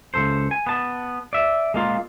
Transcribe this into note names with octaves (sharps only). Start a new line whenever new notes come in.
C#2 G2 A4 C5
G#5
B3 A5
D5 E5
G#3 A#3 F4